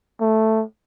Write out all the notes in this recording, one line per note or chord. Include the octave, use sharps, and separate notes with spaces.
A3